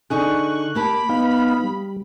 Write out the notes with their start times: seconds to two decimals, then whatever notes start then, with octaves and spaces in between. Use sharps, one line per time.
0.10 D3 D#4 G#4 C#6 F#6
0.75 A#3 G4 A5 B5
1.09 B3 D#4 F5 G5
1.64 G3